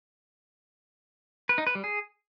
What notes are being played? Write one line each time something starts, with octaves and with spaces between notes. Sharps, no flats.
B4
D#4
B4
G3
G#4